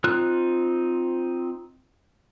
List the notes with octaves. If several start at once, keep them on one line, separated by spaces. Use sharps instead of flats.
C4 D#4 F4 F6 F#6